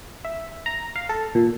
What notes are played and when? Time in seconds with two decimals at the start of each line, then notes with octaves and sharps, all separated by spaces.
0.25 E5
0.66 A#5
0.96 F5
1.09 A4
1.35 A#2